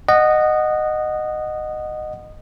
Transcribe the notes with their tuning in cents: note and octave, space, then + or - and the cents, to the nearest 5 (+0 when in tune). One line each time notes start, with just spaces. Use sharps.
D#5 -15 F#5 +0